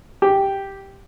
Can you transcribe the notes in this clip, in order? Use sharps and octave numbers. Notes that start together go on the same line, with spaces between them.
G4